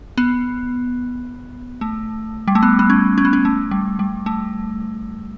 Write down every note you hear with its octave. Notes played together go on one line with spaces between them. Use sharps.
B3
A3
G3
A3
B3
B3
C#4
C#4
B3
C#4
A3
G3
G3
A3